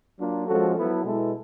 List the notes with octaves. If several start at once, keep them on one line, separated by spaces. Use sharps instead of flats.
F#3 A#3 D4 F4
F3 G#3 C#4 F#4 A4
F#3 B3 E4 A4
B2 G#3 B3 E4 A4